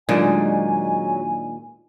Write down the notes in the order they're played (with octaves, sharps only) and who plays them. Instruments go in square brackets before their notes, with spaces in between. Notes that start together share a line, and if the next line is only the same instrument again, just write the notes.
[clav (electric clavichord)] D#2 A#2 [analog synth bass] F#3 [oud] G#3 D4 [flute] G#5